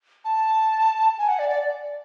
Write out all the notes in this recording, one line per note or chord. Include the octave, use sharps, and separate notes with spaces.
A5
G#5
F#5
D5
D5